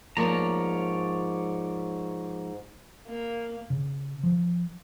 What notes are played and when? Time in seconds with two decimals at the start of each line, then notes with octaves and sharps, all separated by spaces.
0.17 G#2 F3 A#3 C#5 D5 A#5
3.08 A#3
3.70 C#3
4.23 F3